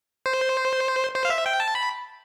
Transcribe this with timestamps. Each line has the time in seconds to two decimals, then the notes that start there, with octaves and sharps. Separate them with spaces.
0.26 C5
1.15 C5
1.25 F5
1.30 E5
1.46 G5
1.60 A5
1.75 B5